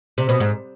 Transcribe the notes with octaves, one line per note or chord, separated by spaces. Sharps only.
C3
B2
G#2